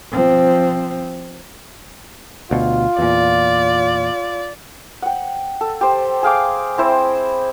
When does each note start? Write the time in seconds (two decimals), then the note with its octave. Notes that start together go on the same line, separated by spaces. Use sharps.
0.12 F3 C4
2.51 D2 B2 F4
2.99 E2 A#2 D5
5.02 F#5 G5
5.61 A4
5.81 G4 C5
6.23 G#4 F5 G5 D6
6.78 C4 E4 C5